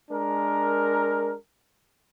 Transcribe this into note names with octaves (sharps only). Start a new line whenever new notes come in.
G#3 D4 A#4